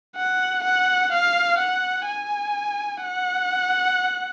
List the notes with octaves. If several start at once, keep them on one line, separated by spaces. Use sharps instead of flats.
F#5
F#5
F5
F#5
G#5
F#5